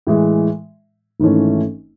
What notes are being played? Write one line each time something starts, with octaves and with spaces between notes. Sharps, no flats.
A2 E3 G#3
G#1 G#2 E3 A3 C#4